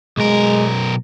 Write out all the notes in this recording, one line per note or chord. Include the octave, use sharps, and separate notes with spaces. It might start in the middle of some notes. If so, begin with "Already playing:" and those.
B1 G#3 A#4